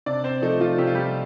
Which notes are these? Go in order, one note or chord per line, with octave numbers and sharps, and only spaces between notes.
C3 D4 D5
C4 C5
F3 A3 D#4
F3 F4
C3 G4
F4
G3 G4